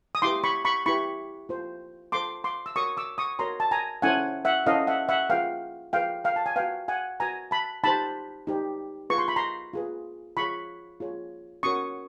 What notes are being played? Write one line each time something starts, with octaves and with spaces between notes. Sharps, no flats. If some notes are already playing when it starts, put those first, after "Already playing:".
D#6
E4 G4 B4 C6 D6
B5 C#6
B5 C#6
E4 G4 B4 B5 C#6
F4 A4 C5
F4 A4 C5 C6 D6
C6 D6
E6
F#4 A#4 C#5 C#6 D#6
D6 E6
C#6 D#6
F#4 A#4 C#5 A#5 C6
A5
G#5 A#5
C#4 E4 A4 C5 F#5 G#5
E5 F#5
C#4 E4 A4 C5 D#5 F5
E5 F#5
E5 F#5
F4 G#4 B4 F5 G5
F4 G#4 B4 F5 G5
F5 G5
A5
G#5
F#4 B4 F5 G5
F#5 G#5
F#4 B4 G#5 A#5
A5 B5
D#4 G4 C5 A5 B5
D#4 G4 C5
F4 G#4 B4 C#6
C6
B5
A#5 C6
F4 G#4 B4
F4 G#4 C#5 B5 C#6
F4 G#4 C#5
C#4 F#4 A#4 C#5 C#6 D#6